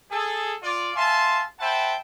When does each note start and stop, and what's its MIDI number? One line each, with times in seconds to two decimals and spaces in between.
0.11 0.55 68
0.11 0.55 69
0.62 0.90 65
0.62 0.90 74
0.95 1.43 76
0.95 1.43 77
0.95 1.43 80
0.95 1.43 81
0.95 1.43 84
1.59 1.94 72
1.59 1.94 76
1.59 1.94 78
1.59 1.94 79
1.59 1.94 81
1.59 1.94 83